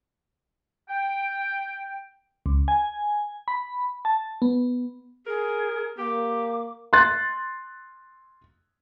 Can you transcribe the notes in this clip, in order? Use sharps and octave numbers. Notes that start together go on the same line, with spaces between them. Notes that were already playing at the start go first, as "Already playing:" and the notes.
G5
C#2
G#5
B5
A5
B3
G#4 A#4
A#3 G4 D6
C6 F#6 A6